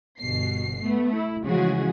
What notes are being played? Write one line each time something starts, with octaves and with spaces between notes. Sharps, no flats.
G1 B2 C7
A3 B3
E4
C#3 E3 F3 G#3 F#4 G#4